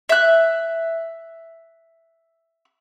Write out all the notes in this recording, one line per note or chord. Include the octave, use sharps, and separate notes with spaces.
E5 F#6